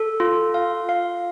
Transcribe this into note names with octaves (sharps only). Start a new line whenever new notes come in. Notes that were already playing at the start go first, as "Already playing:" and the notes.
Already playing: A4
F4
F5
F5